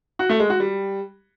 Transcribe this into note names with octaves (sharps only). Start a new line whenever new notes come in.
F#4
A3
G#3
F#4
G3